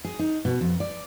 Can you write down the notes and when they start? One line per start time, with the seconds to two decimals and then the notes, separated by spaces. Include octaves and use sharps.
0.05 G#4
0.19 D#4
0.45 B2
0.61 F2
0.80 D5